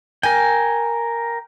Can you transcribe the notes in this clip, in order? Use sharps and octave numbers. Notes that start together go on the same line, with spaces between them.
A#4 G5 G#5